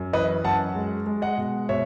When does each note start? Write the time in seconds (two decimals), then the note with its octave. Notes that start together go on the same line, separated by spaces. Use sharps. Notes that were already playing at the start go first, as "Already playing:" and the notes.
Already playing: F#2
0.13 E3 B4 D#5
0.44 F#2 F#5 A5
0.75 G#3
1.07 G#3
1.22 D#5 F#5
1.37 B2
1.69 B2 C#5 E5